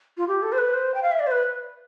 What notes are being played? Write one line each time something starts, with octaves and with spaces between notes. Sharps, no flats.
F4
G4
A4
C5
B4
C5
G5
F5
E5
D5
C5
B4